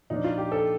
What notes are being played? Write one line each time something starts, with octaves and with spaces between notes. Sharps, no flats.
A#2 F3 A#3 D4 D#4
F4
G4
A4